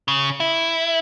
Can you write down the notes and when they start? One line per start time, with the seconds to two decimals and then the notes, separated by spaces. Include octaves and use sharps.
0.08 C#3
0.40 E4